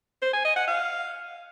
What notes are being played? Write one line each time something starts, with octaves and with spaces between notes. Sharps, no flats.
C5
G#5
D#5
F#5
F5